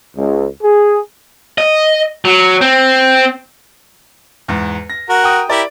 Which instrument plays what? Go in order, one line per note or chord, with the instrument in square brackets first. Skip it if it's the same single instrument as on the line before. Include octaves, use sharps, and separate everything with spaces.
[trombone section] C#2
G#4
[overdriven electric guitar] D#5
F#3
C4
[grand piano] E2 G#2
A#6
[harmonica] F#4 A#4 F#5
[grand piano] G5 D#6
[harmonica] E4 G4 A#4 [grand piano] D5